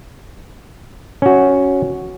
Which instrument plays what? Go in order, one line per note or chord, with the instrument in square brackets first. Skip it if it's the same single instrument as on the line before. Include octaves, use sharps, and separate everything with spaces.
[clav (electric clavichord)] C#4 F#4